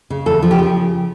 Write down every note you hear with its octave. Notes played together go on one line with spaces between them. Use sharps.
C#3
E2 A4
F3
G4
C#3